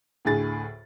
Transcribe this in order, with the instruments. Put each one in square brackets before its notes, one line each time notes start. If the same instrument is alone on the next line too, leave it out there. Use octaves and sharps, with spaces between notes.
[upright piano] D2 A2 G#4 A6